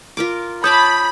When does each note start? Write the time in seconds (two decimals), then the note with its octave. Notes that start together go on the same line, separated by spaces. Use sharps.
0.17 F4 A#4 D6
0.64 C#5 A5 B5 D6 D#6 G6